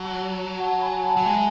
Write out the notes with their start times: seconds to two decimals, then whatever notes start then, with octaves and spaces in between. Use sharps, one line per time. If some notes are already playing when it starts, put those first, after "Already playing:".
Already playing: F#3 F#5 A5
0.60 F#5 A5
0.82 G#5 B5
1.04 F#5 A5
1.17 F#3
1.25 G#3 E5 G#5